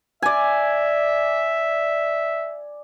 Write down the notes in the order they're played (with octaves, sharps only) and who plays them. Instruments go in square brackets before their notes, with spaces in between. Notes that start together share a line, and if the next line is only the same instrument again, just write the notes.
[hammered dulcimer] D5 G#5 [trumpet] E5